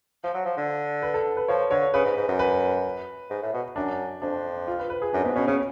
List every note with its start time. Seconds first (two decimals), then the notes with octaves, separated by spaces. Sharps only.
0.23 F3
0.34 F#3
0.46 F3
0.57 D3
1.02 B4
1.14 A4
1.37 B4
1.48 F3 C#5
1.71 D3 C#5
1.93 C#3 B4
2.05 G#2
2.16 G#2
2.28 F#2
2.39 B4
3.30 G#2
3.42 A2
3.53 B2
3.76 F#2 D4
4.22 F2 D4
4.68 F4
4.79 B4
4.90 B4
5.02 G#4
5.13 F#2 D4
5.24 G#2 B3
5.36 B2 C#4
5.47 C#3 C#4